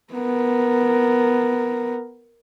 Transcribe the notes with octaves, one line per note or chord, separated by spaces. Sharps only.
B3 A#4